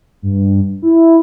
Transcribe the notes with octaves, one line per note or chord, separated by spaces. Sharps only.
G2
E4